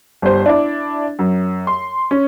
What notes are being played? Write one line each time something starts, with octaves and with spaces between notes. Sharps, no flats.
G1 G3 C5
D4 E4 D5
F#2
C6
C#4